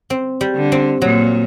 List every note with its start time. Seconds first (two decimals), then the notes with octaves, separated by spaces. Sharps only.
0.10 C4
0.41 G3
0.56 D3
0.72 C4
1.02 A#2 F#3